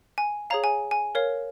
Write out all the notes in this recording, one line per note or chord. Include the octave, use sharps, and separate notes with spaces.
G#5
G#4 C#5 F5 A#5
G#5
G#5
A#4 C#5 F5